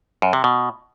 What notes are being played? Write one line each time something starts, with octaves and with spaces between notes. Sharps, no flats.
F#2
C3
B2